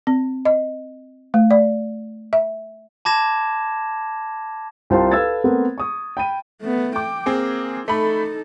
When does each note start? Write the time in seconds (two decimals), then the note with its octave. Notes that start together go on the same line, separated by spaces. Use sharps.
0.07 C4
0.45 D#5
1.34 A3
1.51 D5
2.33 E5
3.05 A5 B5 D6 G#6 A#6 E7
4.90 C2 F4 C5 G5 A5 C6
5.11 A4 B4 F5 E6 G#6 A6
5.44 A3 B3 C4 A#4
5.78 C#6 D#6
6.17 G5 B5 D#7
6.61 A3 B3
6.96 G5 D6
7.26 A#3 C4 G#4
7.88 A3 D#4 A4 B5